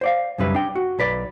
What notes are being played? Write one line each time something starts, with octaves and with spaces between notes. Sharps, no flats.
C5 D5 F5
B1 F#2 C#3 G3 B4 E5
D4 G5
F#4
B1 B4 D5